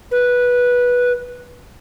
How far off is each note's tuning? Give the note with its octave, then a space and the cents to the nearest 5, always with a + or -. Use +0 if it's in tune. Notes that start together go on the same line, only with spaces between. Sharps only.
B4 -10